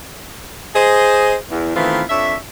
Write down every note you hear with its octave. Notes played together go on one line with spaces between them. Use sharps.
G#4 C5 D#5
E2
D#3 E3 A3 B3 C4 F4
F2 D4 C#5 E5